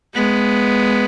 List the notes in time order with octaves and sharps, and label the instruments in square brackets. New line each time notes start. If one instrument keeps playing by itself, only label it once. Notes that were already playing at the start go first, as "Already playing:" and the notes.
[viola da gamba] G#3 B3